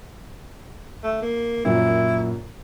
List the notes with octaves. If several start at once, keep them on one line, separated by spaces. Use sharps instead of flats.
A3
A#3
F#2 A#2 E4